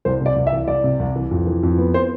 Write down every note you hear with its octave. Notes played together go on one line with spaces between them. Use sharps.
C2 C5
C3 D5
C2
E5
E3
C2 D5
C3
C2
E3
F2
E3
F2
B3
C5